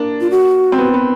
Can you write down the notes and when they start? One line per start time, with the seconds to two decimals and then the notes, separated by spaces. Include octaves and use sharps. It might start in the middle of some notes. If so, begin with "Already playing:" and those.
Already playing: A#3 D4
0.21 F4
0.31 F#4
0.72 C4
0.78 B3
0.94 B3